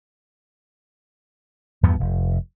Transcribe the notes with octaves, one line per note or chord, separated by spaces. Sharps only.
E2 G2 F3 B3
F1